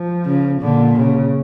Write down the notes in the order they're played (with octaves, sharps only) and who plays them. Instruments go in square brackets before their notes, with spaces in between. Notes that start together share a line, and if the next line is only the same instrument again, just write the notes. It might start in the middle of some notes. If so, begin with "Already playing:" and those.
Already playing: [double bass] F3
[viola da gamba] C#3
[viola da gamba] A#2 [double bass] D3
[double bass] C#3